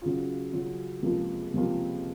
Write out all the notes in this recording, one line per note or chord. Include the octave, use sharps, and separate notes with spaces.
C#3 F#3 C#4 F4
C#3 F#3 C#4 F4
C#2 C3 F3 A#3 F4
C#2 C3 F3 A#3 F4